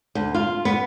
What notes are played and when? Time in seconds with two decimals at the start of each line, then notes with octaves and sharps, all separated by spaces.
0.15 D2
0.34 F4
0.65 B3